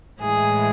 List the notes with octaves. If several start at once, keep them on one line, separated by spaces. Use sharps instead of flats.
A2 E3 G#3 G#4